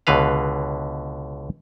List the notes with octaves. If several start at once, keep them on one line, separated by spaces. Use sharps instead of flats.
C#2 B2 D3 B4 F5